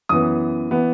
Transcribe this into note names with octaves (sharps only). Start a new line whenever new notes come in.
F#2 E3 B3 D#6
E3 B3